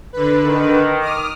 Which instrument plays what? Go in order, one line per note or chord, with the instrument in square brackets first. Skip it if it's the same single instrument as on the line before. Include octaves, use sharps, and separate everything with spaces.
[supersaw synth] D3 B4
[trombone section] D#3
[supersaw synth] D6 D#6 F6